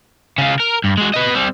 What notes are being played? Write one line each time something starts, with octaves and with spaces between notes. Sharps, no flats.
C#3 F4
A#4
G2
G#3 F#4
B4 D#5
G3 C4